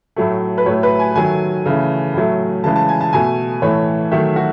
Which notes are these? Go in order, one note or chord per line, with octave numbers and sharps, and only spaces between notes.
A2 F#3 A3
B4
A2 F#3 A3 C#5
B4
G#5
D#3 F#3 A3 G#5
C#3 E3 A3
A2 F#3 A3
C#3 E3 G#3 A5
A5
G#5
A5
B2 A3 G#5
A2 E3 A3 C#5
D#3 F#3 A3 E5
F#4